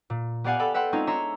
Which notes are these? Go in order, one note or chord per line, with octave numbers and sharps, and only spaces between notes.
A#2
B3 G4 D5 F5 F#5 G#5
A4 D5 G5 B5
B4 E5 F#5 G5 C6
G#3 C4 C#4 D#4 F4 G#4
D4 C#5 E5 A#5 C6